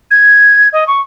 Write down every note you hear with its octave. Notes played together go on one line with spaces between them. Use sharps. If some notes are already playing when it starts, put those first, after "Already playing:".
G#6
D#5
C#6